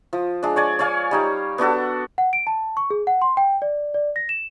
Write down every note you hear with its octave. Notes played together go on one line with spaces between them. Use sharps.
F3
G#3 D4
C#5 D5 G#5
C#5 D5 F5 G#5
G3 D#4 G4
B3 D4 F#4 A4
F#5
D7
A5
C#6
G#4
F#5
C6
G5
D5
D5
A#6
E7